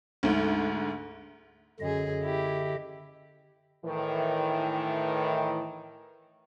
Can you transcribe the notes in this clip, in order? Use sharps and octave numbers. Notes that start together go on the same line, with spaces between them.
D2 G#2
F#2 D3 G#4 D#5
E4 G4
A2 D#3 E3